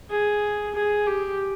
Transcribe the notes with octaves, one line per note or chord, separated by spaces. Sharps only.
G#4
G#4
G4